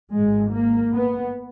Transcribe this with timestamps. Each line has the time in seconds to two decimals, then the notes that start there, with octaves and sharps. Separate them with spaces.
0.12 G#1 G#2 G#3
0.52 A#3
0.93 B3